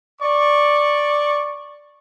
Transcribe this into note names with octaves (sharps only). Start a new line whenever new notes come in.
D5 C#6